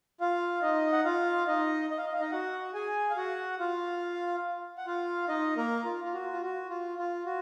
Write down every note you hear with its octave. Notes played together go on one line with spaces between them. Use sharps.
F4 F5
D#4 D#5
F#5
F4 F5
D#4 D#5
D#5
F5
D#5
F5
D#4 D#5
F#4 F#5
G#4 G#5
F5
F#4 F#5
F4 F5
F#5
F4 F5
D#4 D#5
A#3 A#4
F4
F4
F#4
F4
F#4
F4
F4
F#4